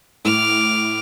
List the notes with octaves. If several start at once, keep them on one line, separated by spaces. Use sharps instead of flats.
A2 D6 F6